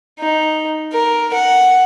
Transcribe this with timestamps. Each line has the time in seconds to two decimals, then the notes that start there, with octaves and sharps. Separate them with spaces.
0.20 D#4
0.93 A#4
1.34 F#5